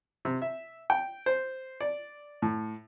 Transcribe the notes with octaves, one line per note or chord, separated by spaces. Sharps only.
C3
E5
G5
C5
D5
A2